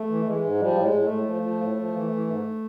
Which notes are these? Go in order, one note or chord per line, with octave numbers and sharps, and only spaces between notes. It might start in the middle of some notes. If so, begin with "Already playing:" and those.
Already playing: A3
E3
E3 G#3
G#2
F3 G3
A2
G#3
A2
A3
A2
F3
F3
A2
F3
E3
E3
G#2